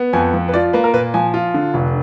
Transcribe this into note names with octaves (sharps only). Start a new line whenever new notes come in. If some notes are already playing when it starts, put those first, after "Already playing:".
Already playing: B3
F2 G#5
F3
B4
F4 D5
A#3 B4
A#4
A#2 B4
F3 G#5
F4
D3
F1